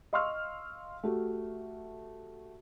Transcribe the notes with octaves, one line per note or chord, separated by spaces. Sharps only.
D#5 F5 C6 C#6 E6 F6
A3 F#4 G4